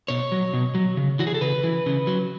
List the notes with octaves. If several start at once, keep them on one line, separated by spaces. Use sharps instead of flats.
B2 C#5
F#3
B2
F#3
C#3
E3 F#4
G#4
A4
C#3 B4
E3
C#3
F#3